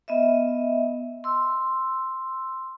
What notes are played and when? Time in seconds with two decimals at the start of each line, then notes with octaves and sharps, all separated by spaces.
0.08 B3 D#5 E5
1.24 C6 E6